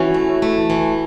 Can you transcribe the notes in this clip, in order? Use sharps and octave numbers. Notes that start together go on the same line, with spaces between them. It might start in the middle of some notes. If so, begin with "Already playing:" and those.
Already playing: E3 C#4 E4 F#4
A3
A3
E3